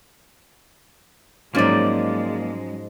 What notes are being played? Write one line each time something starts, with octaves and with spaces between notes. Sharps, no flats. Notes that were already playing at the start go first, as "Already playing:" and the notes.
G#2 F3 F#3 G#3 A#3 C#4 D#4 D5